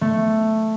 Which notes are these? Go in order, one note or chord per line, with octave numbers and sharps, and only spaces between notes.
A3